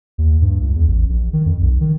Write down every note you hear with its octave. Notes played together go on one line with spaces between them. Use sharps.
D#2
G2
C#2
E2
A1
A#1
D#3
F2
B1
D#3